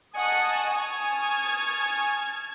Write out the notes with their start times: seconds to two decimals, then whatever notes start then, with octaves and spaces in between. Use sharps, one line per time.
0.13 D#5 F#5 G#5 A5 C#6 D#6
0.76 A5 F6 G#6